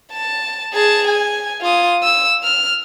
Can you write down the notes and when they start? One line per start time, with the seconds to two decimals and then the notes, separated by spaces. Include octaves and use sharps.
0.12 A5
0.74 G#4 A5
1.07 G#5
1.61 F4 D#6
2.03 E6
2.44 F6